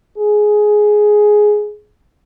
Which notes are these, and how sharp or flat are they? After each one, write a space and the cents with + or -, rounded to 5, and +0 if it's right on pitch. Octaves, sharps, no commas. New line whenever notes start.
G#4 +10